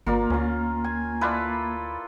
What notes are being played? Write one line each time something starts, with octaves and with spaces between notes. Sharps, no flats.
G#1 A#3 F4 A#4 D5
D2 C#4 F4
G#5
E4 F4 A4 B4 D5